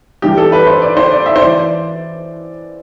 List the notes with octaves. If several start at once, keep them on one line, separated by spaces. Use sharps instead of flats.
G2 E3 G3 D4 G4
A4
B4
C5
D5
C5
D5
E5
C5
E3 D5